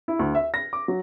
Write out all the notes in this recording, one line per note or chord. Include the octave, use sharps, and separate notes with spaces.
E4
D2
E5
A#6
D6
F#3